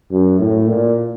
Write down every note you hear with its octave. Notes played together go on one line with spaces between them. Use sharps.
F#2
A2
A#2